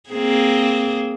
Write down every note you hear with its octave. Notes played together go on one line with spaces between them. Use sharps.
A#3 C4 G#4